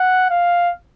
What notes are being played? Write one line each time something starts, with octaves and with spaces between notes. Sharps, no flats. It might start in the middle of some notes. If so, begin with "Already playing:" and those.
Already playing: F#5
F5